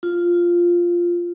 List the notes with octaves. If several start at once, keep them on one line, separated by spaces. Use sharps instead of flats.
F4